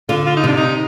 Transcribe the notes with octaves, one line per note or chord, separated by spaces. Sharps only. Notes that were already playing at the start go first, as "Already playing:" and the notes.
D3 F4
F4
D#4
C3 D4
D#4